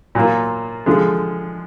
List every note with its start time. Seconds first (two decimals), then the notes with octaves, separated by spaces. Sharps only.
0.15 A#2 F#3 A#3 F4
0.86 D3 F3 G#3